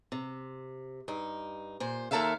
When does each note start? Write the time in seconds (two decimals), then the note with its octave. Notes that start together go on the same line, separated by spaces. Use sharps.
0.12 C3
1.08 G2 D#4
1.80 A#2 C5
2.11 D#2 F3 A4 A#4 E5 F5